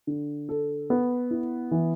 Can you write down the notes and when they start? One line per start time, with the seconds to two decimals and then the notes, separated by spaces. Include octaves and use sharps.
0.07 D3
0.49 A4
0.90 B3
1.31 E4
1.71 E3